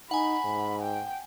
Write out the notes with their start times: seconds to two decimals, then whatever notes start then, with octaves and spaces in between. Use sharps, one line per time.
0.11 D#4 F#5 G#5 B5
0.44 G#2
0.82 G5